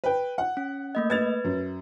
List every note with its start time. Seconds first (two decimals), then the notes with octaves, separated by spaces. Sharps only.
0.04 B4 G5
0.38 F#5
0.57 C#4
0.95 A3 A#3 D#5
1.10 B4 G#6 A6 F7
1.44 F#2